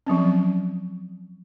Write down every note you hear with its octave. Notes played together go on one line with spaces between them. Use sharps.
F3 F#3 C4 C#4